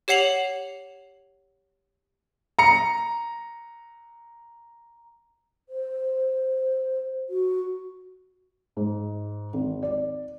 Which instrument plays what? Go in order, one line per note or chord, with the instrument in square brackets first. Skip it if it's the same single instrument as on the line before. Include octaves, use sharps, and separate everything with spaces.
[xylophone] G4 C#5 F#5 C7 F7 F#7
[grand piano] A#5 C#7
[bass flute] C5
F#4
[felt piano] G#2
G#1
D5